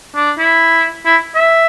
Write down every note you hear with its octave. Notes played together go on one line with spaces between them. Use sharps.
D4
E4
E4
E5